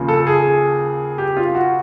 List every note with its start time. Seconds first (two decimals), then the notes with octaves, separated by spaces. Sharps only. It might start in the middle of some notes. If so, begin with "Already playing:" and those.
Already playing: D#2 C#3 F3
0.08 A4
0.27 G#4
1.18 G4
1.37 F4
1.55 F#4